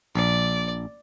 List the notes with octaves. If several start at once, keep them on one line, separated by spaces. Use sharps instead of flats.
A#1 D5